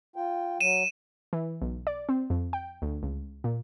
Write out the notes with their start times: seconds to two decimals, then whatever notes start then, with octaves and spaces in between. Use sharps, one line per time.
0.16 F4 G5
0.60 F#3 D#7 E7
1.33 E3
1.62 B1
1.87 D5
2.09 C4
2.30 F2
2.53 G5
2.82 D2
3.03 C#2
3.44 A#2